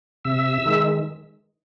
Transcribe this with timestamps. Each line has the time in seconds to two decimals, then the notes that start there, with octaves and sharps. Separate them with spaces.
0.25 C3 E5 E6
0.66 D#3 G#3